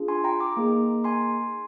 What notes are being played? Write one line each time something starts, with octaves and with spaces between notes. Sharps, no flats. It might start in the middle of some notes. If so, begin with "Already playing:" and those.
Already playing: D4 F4 G#4
G#5 C6
G5 A#5
A#5 D6
A#3 D#4 G#4
G#5 C6